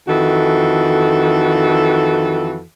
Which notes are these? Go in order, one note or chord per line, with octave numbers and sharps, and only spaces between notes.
F2 D#3 E3 F#4 A4